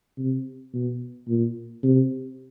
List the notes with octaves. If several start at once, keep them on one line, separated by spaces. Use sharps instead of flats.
C3
B2
A#2
C3